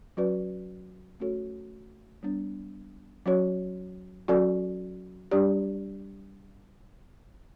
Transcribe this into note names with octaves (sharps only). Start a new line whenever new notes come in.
F#3 C#4 F#4 B4 D5
A3 C#4 F#4 A4 C#5
G3 B3 D4
F#3 C#4 F#4 C#5
F#3 C#4 F#4 A4 D5
G3 D4 G4 D5